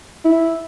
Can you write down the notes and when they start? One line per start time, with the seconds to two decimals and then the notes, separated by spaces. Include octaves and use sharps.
0.25 E4